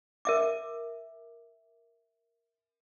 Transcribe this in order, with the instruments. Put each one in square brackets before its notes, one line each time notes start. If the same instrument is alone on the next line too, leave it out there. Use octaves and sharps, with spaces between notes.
[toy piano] A#4 E5 D6